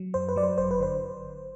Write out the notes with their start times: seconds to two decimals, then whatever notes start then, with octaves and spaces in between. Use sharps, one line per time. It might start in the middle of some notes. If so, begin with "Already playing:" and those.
Already playing: F#3
0.14 F#2 C5
0.29 B4
0.36 F#3 D5
0.43 C5
0.58 G1 C5
0.71 B4
0.80 D3 C5